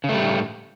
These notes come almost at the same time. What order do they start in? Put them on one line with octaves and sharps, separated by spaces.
C#3 A3 G3 A2